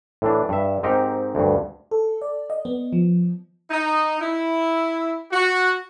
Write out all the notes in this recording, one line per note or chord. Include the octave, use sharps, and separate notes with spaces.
A2 E3 D4
G2 E5
G#2 C4 D#4 G4 A#4
D2 G2
A4
D5
D#5
B3
F3
D#4
E4
F#4